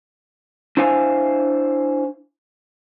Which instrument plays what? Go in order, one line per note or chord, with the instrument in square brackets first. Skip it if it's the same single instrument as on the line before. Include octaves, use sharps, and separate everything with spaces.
[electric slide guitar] D4 E4 C5 F5 G#5